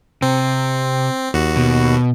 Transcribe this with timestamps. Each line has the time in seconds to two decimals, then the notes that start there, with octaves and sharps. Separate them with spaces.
0.22 C3 C4
1.34 D#2 F#4
1.57 B2